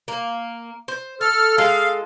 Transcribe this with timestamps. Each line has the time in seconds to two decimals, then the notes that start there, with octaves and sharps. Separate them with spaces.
0.08 A#3
0.88 C5
1.21 A4 A5 F6
1.58 G#3 F4 A4 F5